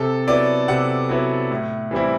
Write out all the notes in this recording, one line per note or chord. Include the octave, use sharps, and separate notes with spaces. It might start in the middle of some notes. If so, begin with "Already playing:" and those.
Already playing: C3 A4
F#3 B3 E4 D5
C3 F#5
F#3 B3 E4
A2
E3 G3 C4 E4